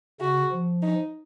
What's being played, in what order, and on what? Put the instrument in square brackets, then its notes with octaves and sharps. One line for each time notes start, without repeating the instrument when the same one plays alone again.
[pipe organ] C#3 [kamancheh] F#4
[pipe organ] F3
[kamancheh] D#4